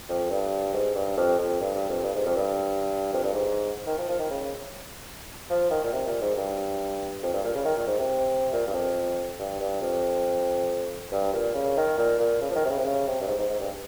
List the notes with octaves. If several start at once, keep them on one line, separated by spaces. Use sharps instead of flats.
F2
G2
G#2
G2
F2
F2
G2
G2
F2
G2
G#2
F2
G2
F2
G2
G#2
D#3
F3
F3
D#3
C#3
C#3
F3
D#3
A#2
C3
A#2
G#2
G2
F2
G2
A#2
C#3
D#3
A#2
G#2
C3
A#2
G2
F2
G2
G2
F2
G2
A#2
C#3
D#3
A#2
A#2
C#3
F3
D#3
C3
C#3
C3
C#3
C3
G2
G#2
G#2
G#2
G2